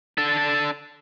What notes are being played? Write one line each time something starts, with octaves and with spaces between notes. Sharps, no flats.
D4 A4